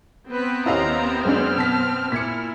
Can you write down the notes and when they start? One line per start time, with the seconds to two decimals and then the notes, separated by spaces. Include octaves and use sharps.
0.32 B3 C4 B4 B5
0.66 D#2 C#4 E4 D#5 F5 A#5 F6
1.25 F#2 G#3 C#4 D4 F6
1.56 B2 A5 B6
2.12 A#2 E4 D6 G#6 B6 C#7